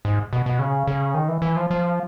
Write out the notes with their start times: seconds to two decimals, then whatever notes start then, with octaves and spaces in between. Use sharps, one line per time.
0.05 G#2
0.33 B2
0.46 B2
0.59 C#3
0.87 C#3
1.14 D#3
1.28 E3
1.42 E3
1.57 F3
1.71 F3